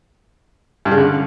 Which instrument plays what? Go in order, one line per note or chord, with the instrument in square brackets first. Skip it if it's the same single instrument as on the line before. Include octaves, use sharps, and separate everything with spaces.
[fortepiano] G2
C#3
D3